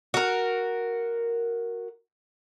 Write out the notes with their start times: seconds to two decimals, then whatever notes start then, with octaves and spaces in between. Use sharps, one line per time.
0.14 F#4 A#4